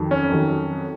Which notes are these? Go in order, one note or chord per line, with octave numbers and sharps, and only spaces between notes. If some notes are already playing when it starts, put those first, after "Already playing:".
Already playing: F2 D#3 F#3
C#4
F2 D#3 F#3